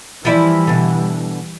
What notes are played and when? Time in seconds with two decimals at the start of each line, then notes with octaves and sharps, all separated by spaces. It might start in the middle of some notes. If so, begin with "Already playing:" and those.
0.25 E3 F3 G3 E4 D5
0.67 B2 D3